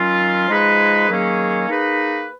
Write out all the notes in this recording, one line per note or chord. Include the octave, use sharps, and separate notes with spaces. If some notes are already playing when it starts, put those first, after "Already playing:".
Already playing: D#3 F#3 C#4 F4
F3 G#3 D#4 G#4 B4
D#3 F#3 A#3 C#4 G#4
A#3 D#4 G#4 B4